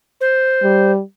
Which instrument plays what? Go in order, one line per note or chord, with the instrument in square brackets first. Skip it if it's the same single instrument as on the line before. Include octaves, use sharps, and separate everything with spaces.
[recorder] C5
[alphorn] G3